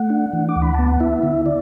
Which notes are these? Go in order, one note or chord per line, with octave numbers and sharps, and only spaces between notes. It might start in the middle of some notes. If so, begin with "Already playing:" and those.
Already playing: A3 F#5
D4
E3
D6
D2
B5
B3 A5
F#5
E4 E5
D3
D5